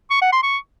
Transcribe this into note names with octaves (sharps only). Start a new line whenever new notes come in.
C#6
F#5
C6
C#6